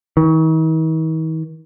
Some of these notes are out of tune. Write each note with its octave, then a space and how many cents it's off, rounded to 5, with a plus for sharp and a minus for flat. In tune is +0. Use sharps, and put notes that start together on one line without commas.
D#3 +45